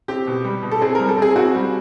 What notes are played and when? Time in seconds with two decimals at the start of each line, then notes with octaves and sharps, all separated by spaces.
0.08 C4 G4
0.27 B2
0.45 G3
0.63 B2
0.71 A4
0.82 C4 G#4
0.95 A#4
1.00 G3
1.09 A4
1.18 C4 G#4
1.36 C4 F#4
1.55 G3